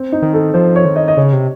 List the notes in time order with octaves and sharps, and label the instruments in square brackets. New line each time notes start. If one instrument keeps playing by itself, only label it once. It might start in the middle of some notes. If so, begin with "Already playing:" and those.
Already playing: [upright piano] C4
D#4
[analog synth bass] D#3
[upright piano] A4
[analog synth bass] F3 [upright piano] C5
[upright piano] C#5
[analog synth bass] D#3
[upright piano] D#5
D#5
[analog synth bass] C#3 [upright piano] C#5
[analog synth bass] C3